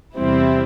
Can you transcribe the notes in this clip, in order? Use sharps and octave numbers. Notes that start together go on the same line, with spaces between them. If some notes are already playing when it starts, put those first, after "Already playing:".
E2 C3 G3 C4 E4